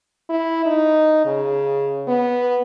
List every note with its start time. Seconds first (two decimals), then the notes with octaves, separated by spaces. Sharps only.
0.29 E4
0.66 D#4
1.25 C#3
2.08 B3